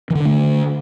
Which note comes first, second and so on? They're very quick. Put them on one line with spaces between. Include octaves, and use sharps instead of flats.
E3 D3 D4 A3